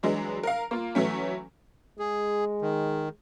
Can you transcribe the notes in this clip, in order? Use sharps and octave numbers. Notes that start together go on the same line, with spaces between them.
E3 F#3 G#3 D4
A#4 F5
A#3 F4
E3 F#3 A3 C#4
G#3 G#4
D#3